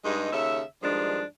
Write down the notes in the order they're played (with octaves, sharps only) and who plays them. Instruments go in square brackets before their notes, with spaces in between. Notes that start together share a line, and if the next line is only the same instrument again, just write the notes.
[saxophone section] G2 G#3 D#4
D#2 C#3 A4 C#5 E5
G2 D#3 F3 G3 G#3 D4